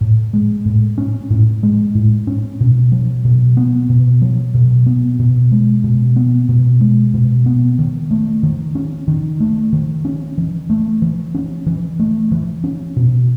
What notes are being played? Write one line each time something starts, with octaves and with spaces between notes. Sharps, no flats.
A2
G#3
A2
C#4
A2
G#3
A2
C#4
B2
F#3
B2
B3
B2
F#3
B2
B3
B2
G#3
B2
B3
B2
G#3
B2
B3
D#3
A3
D#3
C#4
D#3
A3
D#3
C#4
E3
A3
E3
C#4
E3
A3
E3
C#4
B2